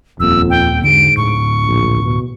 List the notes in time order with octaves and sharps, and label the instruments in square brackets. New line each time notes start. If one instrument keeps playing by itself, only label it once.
[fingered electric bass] D#1 A#3 [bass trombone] F2 [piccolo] E6
[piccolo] G5
[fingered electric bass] E2 D3 [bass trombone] G#2 [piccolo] D7
[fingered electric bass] D2 A2 [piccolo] C#6
[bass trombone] A#1
B2